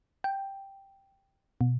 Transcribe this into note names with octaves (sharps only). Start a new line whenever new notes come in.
G5
B2